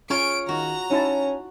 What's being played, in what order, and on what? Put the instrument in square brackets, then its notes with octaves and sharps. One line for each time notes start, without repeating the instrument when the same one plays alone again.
[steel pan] C#4 [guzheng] F4 C#5 G#5 [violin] D7
[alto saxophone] D#3 [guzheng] F#4 [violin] A#5
[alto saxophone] C#4 [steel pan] D#4 E4 A5